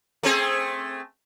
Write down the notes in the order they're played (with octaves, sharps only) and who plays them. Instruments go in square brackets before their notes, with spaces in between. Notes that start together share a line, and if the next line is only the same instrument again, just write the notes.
[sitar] A3 C4 G#4